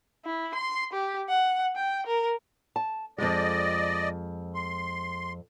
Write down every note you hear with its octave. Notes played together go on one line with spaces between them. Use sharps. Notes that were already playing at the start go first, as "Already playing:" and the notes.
E4
C6
G4
F#5
G5
A#4
A5
F2 G#2 G#3 D5 D#5
C6